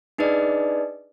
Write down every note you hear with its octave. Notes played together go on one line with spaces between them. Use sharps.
D4 D#4 G#4 B4 D5 D#5